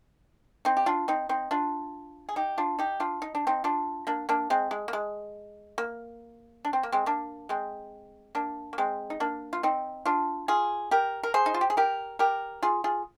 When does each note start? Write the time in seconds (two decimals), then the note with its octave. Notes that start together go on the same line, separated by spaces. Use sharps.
0.65 C4 D#4
0.77 G4
0.86 D4 F4
1.08 C4 D#4
1.29 C4 D#4
1.51 D4 F4
2.29 G#4
2.36 D#4 G4
2.58 D4 F4
2.79 D#4 G4
3.00 D4 F4
3.22 D#4
3.35 D4
3.47 C4 D#4
3.64 D4 F4
4.07 A#3 D4
4.29 A#3 D4
4.50 G#3 C4
4.71 G#3
4.88 A#3
4.93 G#3
5.78 A#3
6.65 D4
6.73 C4
6.83 A#3
6.92 G#3 C4
7.06 A#3 D4
7.49 G#3 C4
8.35 A#3 D4
8.73 A#3
8.78 G#3 C4
9.10 D#4
9.20 A#3 D4
9.53 F4
9.63 C4 D#4
10.05 D4 F4
10.48 F4 G#4
10.91 G4 A#4
11.23 A#4
11.34 G#4 C5
11.46 D#4
11.54 F4
11.61 G4
11.70 G#4
11.77 G4 A#4
12.19 G4 A#4
12.63 F4 G#4
12.84 F4 G#4